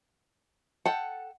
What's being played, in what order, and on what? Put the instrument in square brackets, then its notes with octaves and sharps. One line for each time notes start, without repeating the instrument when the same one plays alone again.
[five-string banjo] A4 G5 [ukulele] F#5